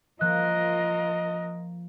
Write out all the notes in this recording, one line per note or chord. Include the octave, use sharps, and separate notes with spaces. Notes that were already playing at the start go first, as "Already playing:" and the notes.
F3 A#3 F4 A#4 D#5 F#6